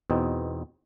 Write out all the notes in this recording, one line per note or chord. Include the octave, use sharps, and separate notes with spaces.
E2 B2 C4 D#4